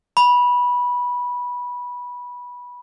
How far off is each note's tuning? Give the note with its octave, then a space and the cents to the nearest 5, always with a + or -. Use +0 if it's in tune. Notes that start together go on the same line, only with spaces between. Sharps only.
B5 -15